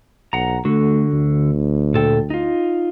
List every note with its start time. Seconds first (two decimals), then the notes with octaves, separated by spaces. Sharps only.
0.33 B1 F#5 A#5
0.65 D3 A3 F#4
1.13 D2
1.94 A#2 A4 G5
2.30 D#4 F4